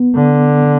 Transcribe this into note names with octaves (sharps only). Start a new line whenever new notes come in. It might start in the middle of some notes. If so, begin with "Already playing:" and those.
Already playing: B3
D3